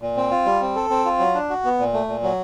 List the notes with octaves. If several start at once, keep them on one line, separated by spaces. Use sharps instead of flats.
A#2
C4
F4
G3
C4
A4
C4
F4
F#3
D4
F#4
B3
A#2
A3
A#2
F#3